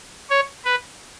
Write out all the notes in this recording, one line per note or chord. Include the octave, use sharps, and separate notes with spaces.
C#5
B4